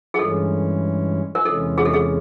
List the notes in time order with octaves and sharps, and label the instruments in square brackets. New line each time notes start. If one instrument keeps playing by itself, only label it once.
[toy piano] G#4
[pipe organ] G2 E3 G#3 C#4 [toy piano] A4
[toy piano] A#4
[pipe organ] E2 C3 E3 G#3 C#4 [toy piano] A4
[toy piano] G#4
A4
G#4